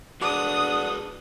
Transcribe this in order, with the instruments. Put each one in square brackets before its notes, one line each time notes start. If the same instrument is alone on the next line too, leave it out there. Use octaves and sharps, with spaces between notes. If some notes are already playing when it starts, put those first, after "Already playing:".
[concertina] D4 F#5 [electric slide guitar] F#4 G#4 B4 [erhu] D#6